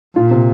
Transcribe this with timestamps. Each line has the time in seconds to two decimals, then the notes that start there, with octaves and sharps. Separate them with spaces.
0.15 A#2 F4
0.31 C3